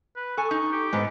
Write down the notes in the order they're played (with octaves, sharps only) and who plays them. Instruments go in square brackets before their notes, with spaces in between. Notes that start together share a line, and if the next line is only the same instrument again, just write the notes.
[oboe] B4
[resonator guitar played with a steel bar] A4 G#5 [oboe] C#6
[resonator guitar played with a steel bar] D#4
[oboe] G4
[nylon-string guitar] G#2 [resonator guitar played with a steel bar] G#3 B3